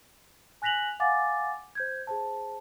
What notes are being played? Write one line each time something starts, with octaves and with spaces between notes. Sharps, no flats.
G#5 F#6 A#6 B6 F7 F#7
F5 F#5 G#5 D6 A6
C5 G6 G#6
G#4 C5 A5